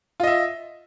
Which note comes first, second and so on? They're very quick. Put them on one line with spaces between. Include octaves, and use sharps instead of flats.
F4 D#5 E5